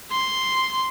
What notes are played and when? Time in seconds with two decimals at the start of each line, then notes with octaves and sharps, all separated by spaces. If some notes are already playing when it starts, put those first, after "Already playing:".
0.11 C6